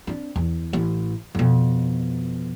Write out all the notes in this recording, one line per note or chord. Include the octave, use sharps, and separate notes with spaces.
C4 D4
E2
A1
F2 B2